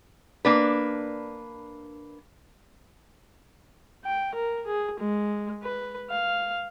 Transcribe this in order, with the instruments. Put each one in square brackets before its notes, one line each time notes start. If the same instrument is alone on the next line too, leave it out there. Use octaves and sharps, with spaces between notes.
[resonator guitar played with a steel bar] A#3 D4 B4
[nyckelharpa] G5
A#4
G#4
G#3
B4
F5